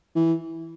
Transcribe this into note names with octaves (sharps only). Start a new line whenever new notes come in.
E3